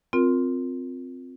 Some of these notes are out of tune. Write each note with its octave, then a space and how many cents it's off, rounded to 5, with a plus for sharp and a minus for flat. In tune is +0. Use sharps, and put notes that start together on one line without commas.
C4 -5 F4 +15 A#4 +0